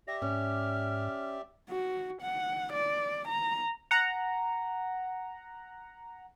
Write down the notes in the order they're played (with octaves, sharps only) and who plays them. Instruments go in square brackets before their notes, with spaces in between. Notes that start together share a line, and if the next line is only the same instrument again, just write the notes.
[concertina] G4 D5 E5 [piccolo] A#6
[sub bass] G#2 [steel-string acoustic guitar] C#4 [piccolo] F6
[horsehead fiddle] F#4
F#5
D5
A#5
[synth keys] F#5 A#5